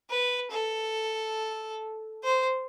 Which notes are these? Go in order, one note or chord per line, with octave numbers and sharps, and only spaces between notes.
B4
A4
C5